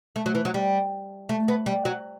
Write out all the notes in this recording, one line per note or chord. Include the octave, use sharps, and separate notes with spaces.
A3
F#3
E3
F#3
G3
A3
B3
G3
F#3